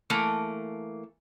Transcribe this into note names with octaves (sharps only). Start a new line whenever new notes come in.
E3 A3 A#3